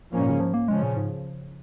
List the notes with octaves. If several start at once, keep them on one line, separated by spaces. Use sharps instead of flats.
G#2 F3 A#3 C#4
A#2
C#3
F3
A#3
C#3 F3 G#3 C#4
A#2
G#2